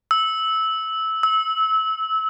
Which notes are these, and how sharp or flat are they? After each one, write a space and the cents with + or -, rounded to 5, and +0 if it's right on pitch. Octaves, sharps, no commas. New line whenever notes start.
E6 -15
E6 -25